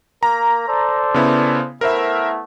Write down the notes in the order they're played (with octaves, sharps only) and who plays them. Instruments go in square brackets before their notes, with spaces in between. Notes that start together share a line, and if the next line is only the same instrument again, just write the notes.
[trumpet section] A#3 A#4 [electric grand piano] A#5
[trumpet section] A4 C5 D5
[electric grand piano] C#3 B3 E4
[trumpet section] A3 B3 E4 [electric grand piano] A#4 C5 E5